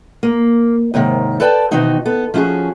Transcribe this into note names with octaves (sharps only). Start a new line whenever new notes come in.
A#3
D#2 G#2 C3 D#3
A4 B4 D5 G5 A5
B2 D#3 E3 C4 D#4 F#4
B3 A4
F3 C#4 E4 F#4 G#4